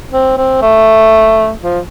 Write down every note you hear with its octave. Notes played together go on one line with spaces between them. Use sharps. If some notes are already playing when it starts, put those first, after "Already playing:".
C4
C4
A3
F3